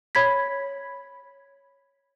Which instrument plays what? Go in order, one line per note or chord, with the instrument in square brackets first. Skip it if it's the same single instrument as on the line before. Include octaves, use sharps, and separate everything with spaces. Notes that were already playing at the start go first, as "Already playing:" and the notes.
[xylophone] C#5 B5 G#6 B6